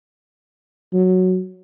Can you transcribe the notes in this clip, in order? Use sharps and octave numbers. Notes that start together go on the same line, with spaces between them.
F#3